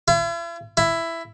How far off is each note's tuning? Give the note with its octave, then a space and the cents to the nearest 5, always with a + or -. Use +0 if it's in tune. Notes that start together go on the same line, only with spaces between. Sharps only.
E4 +45
E4 +10